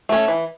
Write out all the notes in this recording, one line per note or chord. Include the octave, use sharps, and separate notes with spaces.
A3 C#4
E3